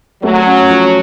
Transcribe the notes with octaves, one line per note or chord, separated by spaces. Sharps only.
F#3 A3
C#4
F3